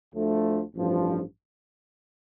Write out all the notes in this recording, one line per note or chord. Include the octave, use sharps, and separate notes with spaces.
D2 D3 F3 A3
A1 G2 F3